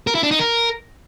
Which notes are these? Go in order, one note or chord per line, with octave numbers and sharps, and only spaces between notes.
A#4
E4
D4
D#4
A#4